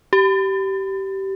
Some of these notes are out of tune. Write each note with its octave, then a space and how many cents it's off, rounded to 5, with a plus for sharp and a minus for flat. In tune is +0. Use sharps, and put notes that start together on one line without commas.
G4 -20